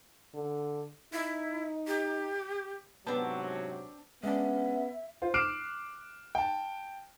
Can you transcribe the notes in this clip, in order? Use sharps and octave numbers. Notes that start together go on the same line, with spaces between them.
D3
D#4 E4
G4
G#2 C3 F#3 B3 C4 D4 A5
G#3 B3 C#4 D4 E5
F4 C5
D6 F6 F#6 C7 D7 E7
G5 A5